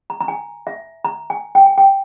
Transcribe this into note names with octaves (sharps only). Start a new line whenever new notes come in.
A#5
A#5
G#5
E5
A#5
G#5
G5
G#5
G5